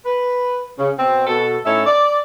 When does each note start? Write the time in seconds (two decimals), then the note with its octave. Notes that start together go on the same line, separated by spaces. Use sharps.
0.06 B4
0.78 C#3
0.98 B2 C4
1.27 B2 A4
1.66 A2 C#4 D#4 E4 A4 E5
1.86 D5